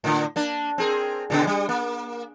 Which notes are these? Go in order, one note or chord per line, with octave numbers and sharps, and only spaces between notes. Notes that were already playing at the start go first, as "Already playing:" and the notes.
A2 D3
A#3 D4
C4 G#4 A#4
A#2 C#3 B3
G3
A#3